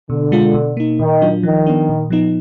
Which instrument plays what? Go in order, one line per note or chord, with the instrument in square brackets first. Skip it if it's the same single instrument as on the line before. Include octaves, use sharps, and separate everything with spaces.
[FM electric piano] B2 [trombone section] D3
[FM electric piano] G#3 D4 F4
B2
A#3 D#4
[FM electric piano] A#2 [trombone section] D#3
[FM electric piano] F#3 D4 F4
[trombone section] D#3 [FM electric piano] F3
[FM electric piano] B3 D4
A#2
F3 B3 D#4